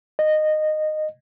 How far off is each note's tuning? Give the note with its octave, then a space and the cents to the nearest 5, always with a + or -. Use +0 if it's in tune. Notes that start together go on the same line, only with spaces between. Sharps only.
D#5 -15